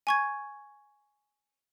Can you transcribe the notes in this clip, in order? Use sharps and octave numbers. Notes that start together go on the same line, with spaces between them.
G#5 C#6 G#6